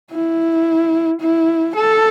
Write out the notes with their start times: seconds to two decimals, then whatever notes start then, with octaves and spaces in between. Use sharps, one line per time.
0.12 E4
1.21 E4
1.76 A4